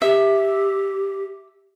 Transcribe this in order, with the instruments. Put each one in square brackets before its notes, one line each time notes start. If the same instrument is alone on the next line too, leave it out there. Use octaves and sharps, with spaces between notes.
[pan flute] G4 [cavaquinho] E5